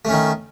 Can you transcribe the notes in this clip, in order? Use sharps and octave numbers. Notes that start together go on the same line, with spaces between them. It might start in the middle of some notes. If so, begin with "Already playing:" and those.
D#3 A3 C#4